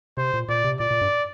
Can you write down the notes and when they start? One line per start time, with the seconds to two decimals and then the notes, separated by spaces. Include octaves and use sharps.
0.17 C3 C5
0.34 A#2
0.49 A#2 D5
0.64 C3
0.80 A#2 D5
0.91 A#2
1.01 G2